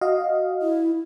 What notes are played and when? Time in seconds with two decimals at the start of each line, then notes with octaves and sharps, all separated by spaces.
0.01 F#4 D#5 F5
0.62 E4